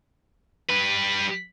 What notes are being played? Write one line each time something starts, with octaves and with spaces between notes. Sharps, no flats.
G3 B4